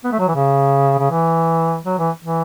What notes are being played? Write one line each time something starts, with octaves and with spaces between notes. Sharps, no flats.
B3
A3
F#3
E3
C#3
C#3
E3
F#3
E3
E3